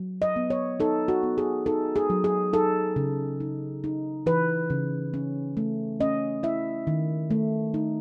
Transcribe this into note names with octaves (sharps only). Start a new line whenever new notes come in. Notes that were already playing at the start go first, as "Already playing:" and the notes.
Already playing: F#3
D#5
B3
C#5
D#4 A4
F#4
B3
G#4
D#4 A4
G#4
F#3
G#4
D#4 A4
C#3
D#4
D#4
E3 B4
C#3
C#4
A3
C#4 D#5
E4 E5
D#3
A3
D#4